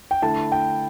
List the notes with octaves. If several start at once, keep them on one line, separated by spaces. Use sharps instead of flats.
G5
D3 A3 E4 A5
G5